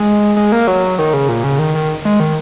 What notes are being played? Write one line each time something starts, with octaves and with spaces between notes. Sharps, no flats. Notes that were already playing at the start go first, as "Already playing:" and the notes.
Already playing: G#3
G#3
A#3
F#3
D#3
C#3
A#2
C#3
D#3
D#3
G#3
D#3